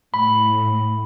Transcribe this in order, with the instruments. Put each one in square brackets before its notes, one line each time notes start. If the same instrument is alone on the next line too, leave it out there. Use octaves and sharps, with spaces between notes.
[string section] A2 [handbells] B5